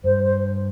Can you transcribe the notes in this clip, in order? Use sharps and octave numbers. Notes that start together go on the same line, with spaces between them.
G2 C5
C5